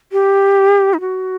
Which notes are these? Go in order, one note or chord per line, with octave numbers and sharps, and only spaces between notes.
G4
D#4
F#4